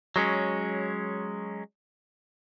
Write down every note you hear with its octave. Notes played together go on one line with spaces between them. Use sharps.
F#3 G#3 C#4